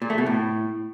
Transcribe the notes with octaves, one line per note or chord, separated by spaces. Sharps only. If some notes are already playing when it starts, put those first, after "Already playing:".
A#2
A3
B2
A2